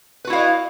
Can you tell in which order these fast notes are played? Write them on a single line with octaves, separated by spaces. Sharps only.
B4 F#4 E4 F5 D#5